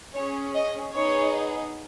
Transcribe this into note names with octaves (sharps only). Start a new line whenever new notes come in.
C#4 G#4 C#5
D#5
B3 D#4 G#4 C#5